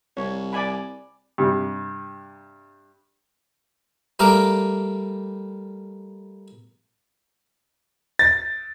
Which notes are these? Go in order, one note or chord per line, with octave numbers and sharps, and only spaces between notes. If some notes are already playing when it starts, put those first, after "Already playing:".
C2 C#5
D5 G#5 B5
G2 C3
G3 A3 A#3 A#4 D6
A6